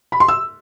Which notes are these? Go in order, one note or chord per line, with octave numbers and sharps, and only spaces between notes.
B5
C6
E6